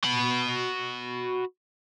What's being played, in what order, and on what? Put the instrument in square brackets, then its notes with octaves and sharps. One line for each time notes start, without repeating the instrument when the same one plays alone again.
[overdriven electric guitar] F#4 B5